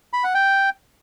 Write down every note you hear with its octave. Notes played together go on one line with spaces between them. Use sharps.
B5
F#5
G5